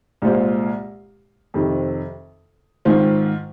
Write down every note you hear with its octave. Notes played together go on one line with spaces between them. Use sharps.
C2 A#2 G#3 F4 C5
F2 C3 D#3 C4
G#2 D#3 C4 F4